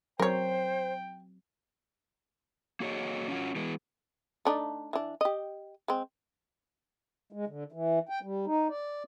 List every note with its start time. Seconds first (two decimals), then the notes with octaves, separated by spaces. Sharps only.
0.20 F#3 C4 A#4 C5 C#5 G5
2.80 A#3 F#4 G#4 C#5 D#5
3.28 C#4 F4 F#4
3.56 E3 G#3 B3
4.45 A3 D4 D#4
4.93 E3 D4
5.21 G4 D#5
5.88 G#3 C4
7.32 G#3
7.47 D3
7.72 E3
8.09 G5
8.22 G3
8.46 D#4
8.69 D5